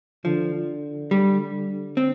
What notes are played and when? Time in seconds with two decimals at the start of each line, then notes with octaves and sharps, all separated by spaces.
0.25 D3 F3
1.11 G3
1.97 C4